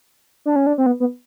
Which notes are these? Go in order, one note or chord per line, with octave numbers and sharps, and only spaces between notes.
D4
C#4
D4
C4
B3
B3